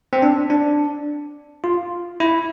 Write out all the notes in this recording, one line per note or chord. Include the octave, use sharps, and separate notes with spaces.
C4
D4
D4
F4
E4